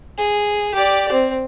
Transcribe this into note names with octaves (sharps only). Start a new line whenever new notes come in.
G#4
G4 D5
C4